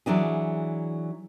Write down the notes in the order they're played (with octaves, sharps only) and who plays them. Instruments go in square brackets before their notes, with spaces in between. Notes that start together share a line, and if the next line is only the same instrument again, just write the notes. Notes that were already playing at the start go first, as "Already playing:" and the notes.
[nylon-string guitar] E3 F#3 D4 G#4